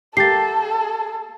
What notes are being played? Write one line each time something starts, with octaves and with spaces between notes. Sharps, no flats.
A#3 G4 A4 A6 C7